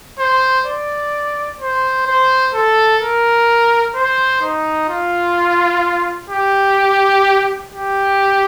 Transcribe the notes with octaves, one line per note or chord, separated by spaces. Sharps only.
C5
D5
C5
C5
A4
A#4
C5
D#4
F4
G4
G4